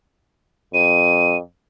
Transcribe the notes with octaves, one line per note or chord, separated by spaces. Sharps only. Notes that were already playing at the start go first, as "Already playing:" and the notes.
F2 D#7